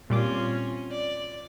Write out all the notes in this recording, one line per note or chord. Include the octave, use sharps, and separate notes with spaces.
A#2 G3 C4 C#4 F4 D6
D5